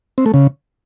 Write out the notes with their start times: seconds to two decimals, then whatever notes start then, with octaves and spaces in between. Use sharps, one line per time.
0.18 C4
0.26 A3
0.34 C#3